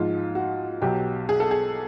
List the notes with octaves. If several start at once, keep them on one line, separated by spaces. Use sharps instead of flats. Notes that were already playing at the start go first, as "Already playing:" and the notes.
Already playing: G#2 F3 G#3 F4
F#4
B1 B2 F#3 G4
G#4
A4
G#4